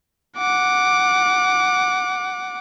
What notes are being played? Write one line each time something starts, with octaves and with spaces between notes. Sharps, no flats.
F#5 D6